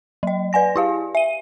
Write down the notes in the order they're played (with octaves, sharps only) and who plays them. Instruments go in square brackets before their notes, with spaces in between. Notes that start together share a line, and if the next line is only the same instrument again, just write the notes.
[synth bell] F#3 D#5
B4 D5 G#5 A#6
E4 G4 F5
E5 D#7